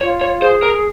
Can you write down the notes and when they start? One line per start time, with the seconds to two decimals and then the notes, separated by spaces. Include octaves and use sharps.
0.01 F4 C#5
0.21 C#5
0.42 G#4 C5
0.63 A#4